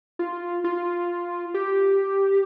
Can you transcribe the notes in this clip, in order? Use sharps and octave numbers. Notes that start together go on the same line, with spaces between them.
F4
F4
G4